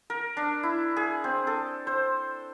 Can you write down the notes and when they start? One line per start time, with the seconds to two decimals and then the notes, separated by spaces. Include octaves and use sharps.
0.10 A#4
0.37 D4
0.63 E4
0.97 G#4
1.24 C4
1.47 A4
1.87 C5